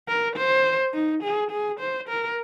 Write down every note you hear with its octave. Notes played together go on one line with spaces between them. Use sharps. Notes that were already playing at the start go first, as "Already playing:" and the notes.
A#4
C5
D#4
G#4
G#4
C5
A#4